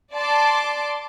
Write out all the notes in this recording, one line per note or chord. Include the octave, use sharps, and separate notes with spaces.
D5 A5 C6 D6